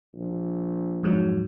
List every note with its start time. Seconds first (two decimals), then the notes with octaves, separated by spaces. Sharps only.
0.15 A#1
1.03 F2 G#2 F#3